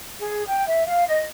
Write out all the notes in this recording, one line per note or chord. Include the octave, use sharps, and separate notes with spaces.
G#4
G5
E5
F5
D#5